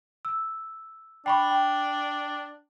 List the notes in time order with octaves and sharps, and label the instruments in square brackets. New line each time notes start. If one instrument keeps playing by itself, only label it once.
[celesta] E6
[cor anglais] D4 [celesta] G5 B5 C#6
[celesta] G5